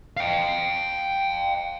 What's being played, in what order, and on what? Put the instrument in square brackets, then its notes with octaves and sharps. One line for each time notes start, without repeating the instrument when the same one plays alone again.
[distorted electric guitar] F5 G5